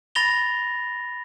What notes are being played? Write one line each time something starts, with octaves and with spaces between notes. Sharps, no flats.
B5 A6 A#6 F7 G7